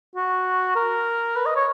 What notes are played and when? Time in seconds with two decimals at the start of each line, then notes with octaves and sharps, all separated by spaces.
0.16 F#4
0.76 A#4
1.36 B4
1.46 D#5
1.56 C#5